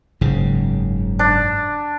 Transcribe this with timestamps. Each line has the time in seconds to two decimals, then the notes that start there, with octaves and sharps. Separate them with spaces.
0.21 F#1 G#2 C#3
1.19 D4